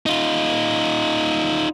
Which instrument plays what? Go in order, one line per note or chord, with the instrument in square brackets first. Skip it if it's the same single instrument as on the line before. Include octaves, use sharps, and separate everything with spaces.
[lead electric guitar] D#4 F4